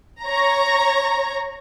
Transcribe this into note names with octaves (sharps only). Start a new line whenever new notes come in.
C#5 A#5